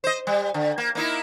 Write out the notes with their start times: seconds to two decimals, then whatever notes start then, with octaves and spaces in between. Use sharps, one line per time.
0.04 C5 D#5
0.27 G3
0.54 D3
0.78 A#3
0.95 A#3 D#4 E4